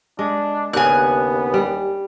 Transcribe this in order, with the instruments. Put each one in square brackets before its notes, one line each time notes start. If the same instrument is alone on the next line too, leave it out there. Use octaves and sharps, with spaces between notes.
[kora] G#3 [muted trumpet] D4
[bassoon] D#2 [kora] C#3 D4 [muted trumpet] B3 [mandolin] G#5 F#6
[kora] G3